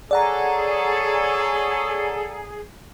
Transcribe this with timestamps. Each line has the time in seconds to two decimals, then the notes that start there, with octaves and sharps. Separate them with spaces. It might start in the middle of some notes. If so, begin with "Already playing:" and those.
0.11 G#4 A4 C#5 D5 F#5 A#5